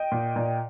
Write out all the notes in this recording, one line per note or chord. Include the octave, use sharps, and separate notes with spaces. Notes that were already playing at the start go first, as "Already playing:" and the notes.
Already playing: D#5 G5
A#2
A#2